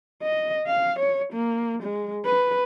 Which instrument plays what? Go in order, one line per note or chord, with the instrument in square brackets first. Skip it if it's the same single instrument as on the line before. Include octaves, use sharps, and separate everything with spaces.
[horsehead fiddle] D#5
F5
C#5
A#3
G#3
B4